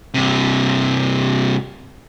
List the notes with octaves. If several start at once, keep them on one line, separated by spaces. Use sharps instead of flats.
G2 C3